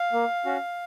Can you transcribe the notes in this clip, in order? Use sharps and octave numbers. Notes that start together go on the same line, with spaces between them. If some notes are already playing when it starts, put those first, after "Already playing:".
Already playing: F5
A#3
C#4 F#4